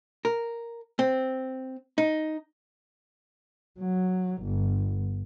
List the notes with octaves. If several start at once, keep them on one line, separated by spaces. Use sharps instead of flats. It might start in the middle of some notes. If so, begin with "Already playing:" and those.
A#4
C4
D#4
F#3
G1